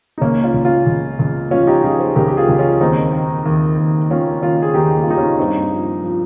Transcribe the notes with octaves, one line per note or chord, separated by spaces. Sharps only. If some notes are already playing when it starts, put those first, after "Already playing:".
D#4
C#2 A#3 C#4
C#4 F4
C#2
C#4 F4
C#2
C#2
F3 C#4 F4
D#4 G4
C#3 F4 G#4
G#4 C5
C#2 G4 A#4
G4
F4 G#4
C#2
C#4 F4
D#2 C4 D#4
D#3
D#2
D#2
D#3 C#4 F4
D#3 C#4 F4
G#4
D#2 D#4 G4
G4
F4
D#3 D#4 G4
C#4 F4
G2 C4 D#4
F3
F3